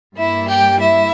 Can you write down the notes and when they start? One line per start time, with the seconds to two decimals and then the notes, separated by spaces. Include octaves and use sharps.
0.17 G2 G3 A#3 E4 E5
0.50 G4 G5
0.80 E4 E5